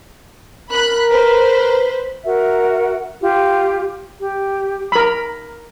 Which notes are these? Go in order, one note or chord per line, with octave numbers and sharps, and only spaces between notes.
A#4 B5 F#6
B4 C5
F#4 A#4 E5
F4 G4
G4
A#4 B5